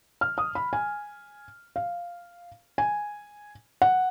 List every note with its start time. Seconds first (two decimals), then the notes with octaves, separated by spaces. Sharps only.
0.21 F6
0.38 D#6
0.55 B5
0.73 G#5
1.76 F5
2.78 G#5
3.82 F#5